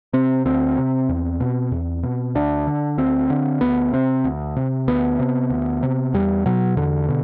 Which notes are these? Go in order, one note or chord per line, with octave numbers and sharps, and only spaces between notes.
C3 C4
D2 C4
C3
E2
B2
E2
B2
D2 D4
D3
D2 C4
D3
D2 B3
C3 C4
D2
C3
D2 B3
C3
D2
C3
E2 G3
B2 F#3
E2 D3
B2